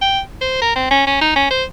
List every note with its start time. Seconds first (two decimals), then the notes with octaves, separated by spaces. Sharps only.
0.02 G5
0.41 C5
0.62 A#4
0.76 C4
0.91 C#4
1.07 C#4
1.21 D#4
1.36 C#4
1.51 C5